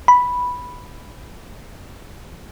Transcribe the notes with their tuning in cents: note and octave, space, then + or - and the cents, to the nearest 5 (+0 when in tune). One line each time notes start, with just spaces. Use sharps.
B5 -5